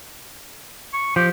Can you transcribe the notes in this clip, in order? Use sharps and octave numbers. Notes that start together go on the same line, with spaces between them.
C#6
F3 G4